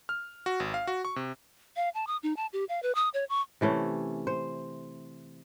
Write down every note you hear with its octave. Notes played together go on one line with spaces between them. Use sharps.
F6
F#4
G#1
F5
F#4
C#6
C3
F5
A5
D#6
D#4
A5
G4
F5
B4
D#6
C#5
C#6
C3 E3 A3 C#4
C5